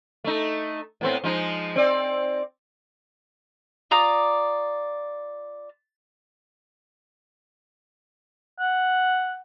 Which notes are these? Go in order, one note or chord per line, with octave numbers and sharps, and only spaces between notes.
A3 D#4
A2 B3 C4
F3 G#3 D#4
C4 D5
F4 D5 A#5 D#6
F#5